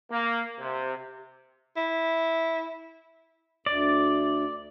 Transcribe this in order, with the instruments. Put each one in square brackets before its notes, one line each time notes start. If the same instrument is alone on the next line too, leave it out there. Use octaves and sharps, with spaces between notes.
[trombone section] A#3
C3
[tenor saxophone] E4
[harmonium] D2 [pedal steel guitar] D5